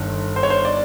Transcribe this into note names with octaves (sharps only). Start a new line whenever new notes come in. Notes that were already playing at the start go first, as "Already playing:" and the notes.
Already playing: G1 G2 D#3
C5
C#5
C5
D5